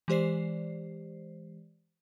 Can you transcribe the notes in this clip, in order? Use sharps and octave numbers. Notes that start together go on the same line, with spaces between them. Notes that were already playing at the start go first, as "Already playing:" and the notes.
E3 G#3 G4 C5 D5 C7